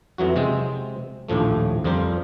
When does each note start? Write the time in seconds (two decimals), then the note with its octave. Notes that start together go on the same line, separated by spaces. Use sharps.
0.18 F2 E3 F#3 F#4
0.36 C3 G#3 C4
1.29 A#1 D#2 A2 F3 A3
1.84 F2 F3 G3 A#4 C5